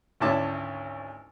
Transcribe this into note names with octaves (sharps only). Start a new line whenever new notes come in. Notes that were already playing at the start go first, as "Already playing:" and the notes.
G#1 D2 C#4 E4 A5 D6